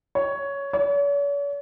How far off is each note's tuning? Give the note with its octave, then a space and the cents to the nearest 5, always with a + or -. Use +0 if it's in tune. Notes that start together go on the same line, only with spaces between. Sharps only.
C#5 +10
C#5 +45